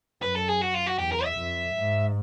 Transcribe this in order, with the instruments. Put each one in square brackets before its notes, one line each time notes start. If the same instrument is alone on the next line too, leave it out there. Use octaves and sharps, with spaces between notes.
[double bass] F#2 [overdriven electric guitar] B4
[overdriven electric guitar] A4
G#4
F#4
F4
F#4
[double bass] E2 [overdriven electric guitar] G4
[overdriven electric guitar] A#4
E5
[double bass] F2
G#2